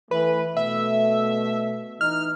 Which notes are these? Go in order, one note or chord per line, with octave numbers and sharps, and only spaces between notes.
E3 A3 B4
B2 A3 E5
E3 D#4 F6